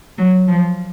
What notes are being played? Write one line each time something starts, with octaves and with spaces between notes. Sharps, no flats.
F#3
F3